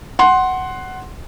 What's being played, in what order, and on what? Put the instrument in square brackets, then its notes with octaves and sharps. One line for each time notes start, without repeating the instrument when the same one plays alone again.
[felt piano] F#5 C6